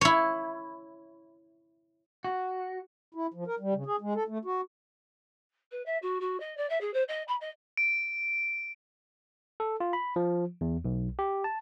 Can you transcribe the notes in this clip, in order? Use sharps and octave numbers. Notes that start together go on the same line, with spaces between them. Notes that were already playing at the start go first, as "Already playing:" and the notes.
E4 C#5
F#4
E4
F3
A#4
G3
C#3
G#4
G#3
A4
A3
F#4
B4
E5
F#4
F#4
D#5
D5
E5
G#4
C5
D#5
B5
D#5
D7
A4
F4
B5
F3
E2
B1
G4
A5